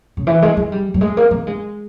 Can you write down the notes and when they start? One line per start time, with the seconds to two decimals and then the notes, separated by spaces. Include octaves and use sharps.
0.17 C#3
0.27 E3
0.42 G#3
0.57 G#3
0.72 G3
0.94 G3
1.01 G#3
1.17 A#3
1.31 A#3
1.47 G#3